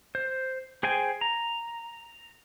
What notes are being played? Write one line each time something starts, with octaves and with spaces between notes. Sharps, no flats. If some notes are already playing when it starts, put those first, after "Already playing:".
C5
G#4 C5 G5 G#5
A#5